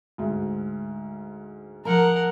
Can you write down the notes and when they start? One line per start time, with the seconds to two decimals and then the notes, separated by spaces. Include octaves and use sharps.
0.18 D2 G#2
1.85 F3 A#4 F#5 A#5